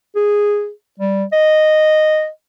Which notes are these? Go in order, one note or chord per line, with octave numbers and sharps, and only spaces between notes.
G#4
G3
D#5